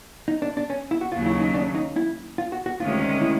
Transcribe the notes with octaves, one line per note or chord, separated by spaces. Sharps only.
D#4
D4
D4
C#4
E4
F#4
D#2 C#3 F#3 F4
E4
D#4
D4
D#4
E4
F4
F#4
F#4
D2 C3 D#3 G#3 C#4 F4
E4